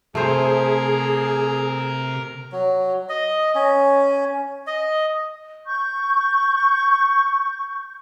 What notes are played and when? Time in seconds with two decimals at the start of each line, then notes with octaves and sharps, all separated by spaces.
0.15 C3 A3 G#4 A#4 C5 A#5
2.52 F#3
3.09 D#5
3.55 C#4
4.67 D#5
5.66 C#6 G6